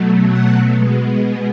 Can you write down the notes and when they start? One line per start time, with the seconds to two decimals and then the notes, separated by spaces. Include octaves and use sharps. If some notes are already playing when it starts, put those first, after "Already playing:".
Already playing: B2 F#3 A3
0.28 F#5
0.75 B2 G#3 B3